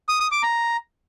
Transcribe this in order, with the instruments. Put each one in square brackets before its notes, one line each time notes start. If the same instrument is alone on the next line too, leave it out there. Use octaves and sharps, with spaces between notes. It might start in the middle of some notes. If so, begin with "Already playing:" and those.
[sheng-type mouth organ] D#6
D#6
D6
A#5